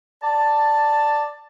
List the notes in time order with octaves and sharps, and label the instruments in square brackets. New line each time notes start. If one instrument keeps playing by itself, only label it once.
[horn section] D5 A5